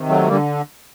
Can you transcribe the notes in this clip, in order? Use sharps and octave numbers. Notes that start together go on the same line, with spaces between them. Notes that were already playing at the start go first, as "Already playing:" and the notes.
Already playing: C3 D#3
F#3 A3
D3 G3 A#3